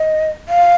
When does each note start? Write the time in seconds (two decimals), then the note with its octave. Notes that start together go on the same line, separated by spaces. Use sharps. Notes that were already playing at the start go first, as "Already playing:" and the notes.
Already playing: D#5
0.49 F5